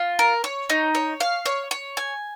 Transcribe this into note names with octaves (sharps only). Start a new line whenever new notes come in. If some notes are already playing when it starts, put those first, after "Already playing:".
Already playing: F4
A#4
C#5
D#4
C#5
F5
C#5
C#5
G#5